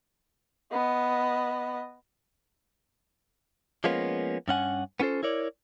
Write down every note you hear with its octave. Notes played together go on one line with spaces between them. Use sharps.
B3 D#5
F3 G#3 A#3 B3 C#4 F4
G2 C#4 F#5 G#5
B3 C#4 F4 A4 C5
E4 A#4 C#5 D5